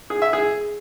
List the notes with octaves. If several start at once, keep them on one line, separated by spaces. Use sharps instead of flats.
G#4
E5
G#4